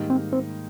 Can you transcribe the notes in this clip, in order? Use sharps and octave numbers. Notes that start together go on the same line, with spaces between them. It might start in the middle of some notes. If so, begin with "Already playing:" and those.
Already playing: G#2 D#3 G3 A#3 D#4
C4
C4